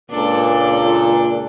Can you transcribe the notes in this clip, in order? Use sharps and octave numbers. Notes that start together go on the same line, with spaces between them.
C#2 A#2 D4 A4